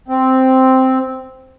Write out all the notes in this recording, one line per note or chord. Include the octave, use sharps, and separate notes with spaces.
C4